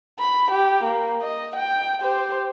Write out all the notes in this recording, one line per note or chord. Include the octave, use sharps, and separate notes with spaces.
B5
G4
A#3
D#5
G5
G4 C5